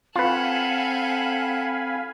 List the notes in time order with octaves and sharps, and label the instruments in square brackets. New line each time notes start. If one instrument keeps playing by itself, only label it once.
[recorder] C4 [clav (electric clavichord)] F4 B4 [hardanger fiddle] A4 F#5 [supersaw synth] F5 G#5 B5